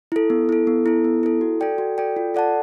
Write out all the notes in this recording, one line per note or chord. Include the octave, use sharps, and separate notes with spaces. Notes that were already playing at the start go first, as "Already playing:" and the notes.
E4 A4
B3
E4 A4
B3
E4 A4
B3
E4 A4
F#4
A4 D5 G5
F#4
A4 D5 G5
F4
A4 D5 F#5 A5